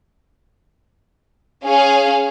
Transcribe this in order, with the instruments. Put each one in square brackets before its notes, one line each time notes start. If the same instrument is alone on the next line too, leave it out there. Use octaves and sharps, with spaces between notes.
[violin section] C#4 G#4 F5 [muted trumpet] G#5